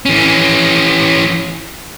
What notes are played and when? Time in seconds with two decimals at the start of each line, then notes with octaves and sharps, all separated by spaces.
0.06 E3 C#4